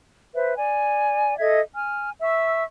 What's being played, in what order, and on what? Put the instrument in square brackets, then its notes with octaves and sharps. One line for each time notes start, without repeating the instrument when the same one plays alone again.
[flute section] B4 C5 E5
D5 G#5
A4 D#5 E5 G#6
G#5 F6
E5 C#6 E6